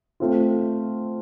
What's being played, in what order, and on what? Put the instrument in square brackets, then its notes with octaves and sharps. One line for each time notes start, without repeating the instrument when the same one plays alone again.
[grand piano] A3 C4 F4